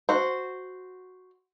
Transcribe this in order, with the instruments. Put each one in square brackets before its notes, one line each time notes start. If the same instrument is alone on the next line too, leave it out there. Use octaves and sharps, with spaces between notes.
[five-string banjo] F#4 C5